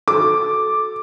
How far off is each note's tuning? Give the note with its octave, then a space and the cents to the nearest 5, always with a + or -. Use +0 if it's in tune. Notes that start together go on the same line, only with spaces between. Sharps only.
F#4 +0 A4 -15 D6 +0